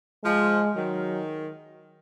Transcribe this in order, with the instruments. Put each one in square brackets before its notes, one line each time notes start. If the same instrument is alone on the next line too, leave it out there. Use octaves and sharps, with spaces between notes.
[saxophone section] F3 [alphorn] G#3
[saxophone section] D#3 [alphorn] F#3